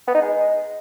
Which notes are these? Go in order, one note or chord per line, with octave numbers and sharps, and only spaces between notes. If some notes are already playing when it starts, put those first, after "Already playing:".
B3
D#4
G#3